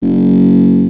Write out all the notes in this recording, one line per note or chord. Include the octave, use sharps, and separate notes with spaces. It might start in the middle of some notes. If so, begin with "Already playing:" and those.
F#1